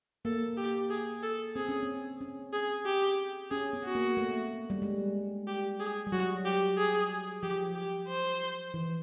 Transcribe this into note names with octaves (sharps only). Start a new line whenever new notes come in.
A#3 A4
G4
G#4
A4
C4 G#4
C#4
C4
C#4
G#4
G4
C#4 G#4
B3
F#4
A#3
A3
G3
G#3
G4
G#4
G3
F#3 F#4
G4
G#4
F3 G4
G4
C5
E3